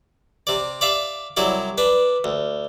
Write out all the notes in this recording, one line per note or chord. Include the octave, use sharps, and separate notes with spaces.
C3 D5
D5 E5 F5
C2 F#3 E4 D5
D4 B4
D2